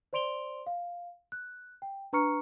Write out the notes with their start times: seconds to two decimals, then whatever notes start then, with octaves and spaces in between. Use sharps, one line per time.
0.13 C5 D5 C6 D7 F7 G7
0.67 F5
1.32 F#6
1.82 G5
2.13 D4 B4 A#5 C#6 F6 C#7